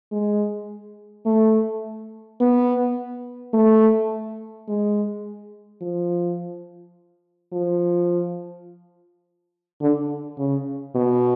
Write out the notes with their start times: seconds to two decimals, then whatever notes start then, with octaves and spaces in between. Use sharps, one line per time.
0.12 G#3
1.26 A3
2.40 B3
3.54 A3
4.68 G#3
5.82 F3
7.53 F3
9.81 D3
10.38 C#3
10.95 B2